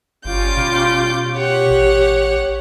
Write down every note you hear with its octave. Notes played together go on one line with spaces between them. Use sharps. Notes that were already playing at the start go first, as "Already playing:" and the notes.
G1 G3 C#4 F4 D6 G6
B2
G4 C#5 F#5
A1